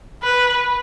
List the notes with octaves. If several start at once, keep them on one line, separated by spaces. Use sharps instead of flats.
B4